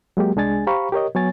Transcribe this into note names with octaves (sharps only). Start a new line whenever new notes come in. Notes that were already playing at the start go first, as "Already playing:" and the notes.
F#3 G#3 A#3 G4
C2 G#3 D4 G#4 G#5 A6
G4 C5 F5 A#5 B5 C#6
G4 A#4 C#5 D#5
F#3 B3 C#5 G#5 A6